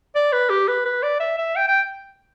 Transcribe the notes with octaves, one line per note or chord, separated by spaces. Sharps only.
D5
B4
G4
B4
B4
D5
E5
E5
G5
G5